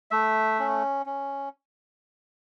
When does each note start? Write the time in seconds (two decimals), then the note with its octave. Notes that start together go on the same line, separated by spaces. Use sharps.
0.11 A3 E5
0.59 C#4
1.06 C#4